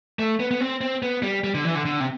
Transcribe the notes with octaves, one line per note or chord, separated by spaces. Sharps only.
A3
B3
B3
C4
C4
B3
G3
G3
D3
E3
D3
D3
C3